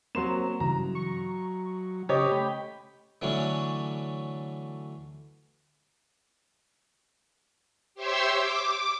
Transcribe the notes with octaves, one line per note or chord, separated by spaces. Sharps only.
F#3 A#3 C4 A#4 C6 E7
G2 C#3 E3 F#3 A#5
C#6
C#3 G4 C#5 D#5
A3 G5 B5
D3 E3 F#3 A3 C#4 D4
G4 C5 C#5 E5 C6 E6
D6